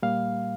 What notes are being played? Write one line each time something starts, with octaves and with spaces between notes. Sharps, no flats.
A#2 G3 A#3 F5